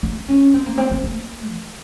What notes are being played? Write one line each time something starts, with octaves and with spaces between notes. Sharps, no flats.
D#4
C#4
C4
A#3
C4
A#3
A#3
D#3